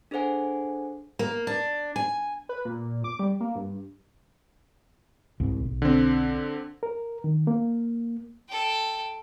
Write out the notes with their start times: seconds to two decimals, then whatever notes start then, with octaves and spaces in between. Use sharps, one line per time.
0.11 D4 G#4 A4 C5 F#5 G#5
1.19 A#3
1.47 D4
1.96 G#5
2.49 B4
2.65 A#2
3.04 D6
3.19 G3
3.40 A#3
3.56 G2
5.40 C2 G#2
5.65 B1
5.82 D3 C4
6.83 A#4
7.24 D#3
7.47 A#3
8.48 A4 G5